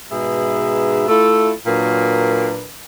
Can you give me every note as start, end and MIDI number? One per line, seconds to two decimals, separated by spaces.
0.11 1.06 44
0.11 1.06 47
0.11 1.06 68
0.11 1.06 71
0.11 1.06 76
1.08 1.52 57
1.08 1.52 64
1.08 1.52 65
1.08 1.52 69
1.67 2.66 46
1.67 2.66 54
1.67 2.66 62
1.67 2.66 70
1.67 2.66 71